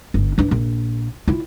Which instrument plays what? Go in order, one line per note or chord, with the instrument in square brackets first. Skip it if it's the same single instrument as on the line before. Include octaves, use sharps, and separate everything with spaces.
[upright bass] G1
E3 D4
A#1
E4 F4